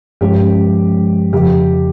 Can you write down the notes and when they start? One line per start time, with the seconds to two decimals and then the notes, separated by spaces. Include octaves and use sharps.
0.21 G2 F3 G#3 C#4 G4
1.33 F2 C#3 F3 G4